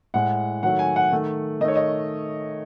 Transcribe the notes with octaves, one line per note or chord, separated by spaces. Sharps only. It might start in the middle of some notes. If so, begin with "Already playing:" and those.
A2 G#3 F#5
D#3 F#3 A3 F#5
G#5
F#5
D#3 A3
D#3 A3 C#5 D#5
D#5